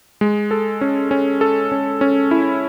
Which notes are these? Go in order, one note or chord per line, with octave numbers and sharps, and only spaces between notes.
G#3
A4
C#4
C#4
A4
C#4
C#4
E4